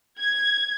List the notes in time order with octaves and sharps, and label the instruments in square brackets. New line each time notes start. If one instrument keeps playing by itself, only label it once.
[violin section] G#6